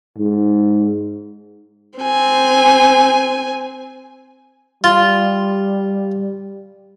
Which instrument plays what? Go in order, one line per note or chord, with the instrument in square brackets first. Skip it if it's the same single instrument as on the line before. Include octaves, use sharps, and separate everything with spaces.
[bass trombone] G#2
[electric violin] C4 G#5
[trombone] G3 [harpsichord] F4